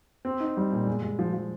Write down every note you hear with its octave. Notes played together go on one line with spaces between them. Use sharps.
C4
D#4
G3
A#2
G#3
G#3
F3
F3